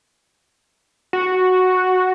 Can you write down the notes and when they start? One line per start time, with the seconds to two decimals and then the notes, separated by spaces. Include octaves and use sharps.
1.13 F#4